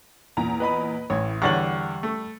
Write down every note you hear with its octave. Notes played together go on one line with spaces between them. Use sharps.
E2 A#2 A#5
B4 D#5 B5
A1 A2 C#5
E2 D3 G3 C#5 C#6 A6 F#7
A3